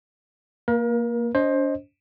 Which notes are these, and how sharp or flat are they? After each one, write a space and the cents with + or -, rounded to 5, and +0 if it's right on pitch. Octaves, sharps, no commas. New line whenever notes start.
A#3 +0 A#4 +35
D4 -45 C5 +20 D#5 +0